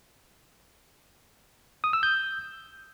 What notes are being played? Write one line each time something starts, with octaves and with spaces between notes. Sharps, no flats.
D#6
E6
G6